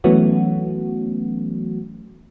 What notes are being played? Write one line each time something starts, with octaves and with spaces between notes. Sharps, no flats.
E3 F#3 A3 B3 C#4 F#4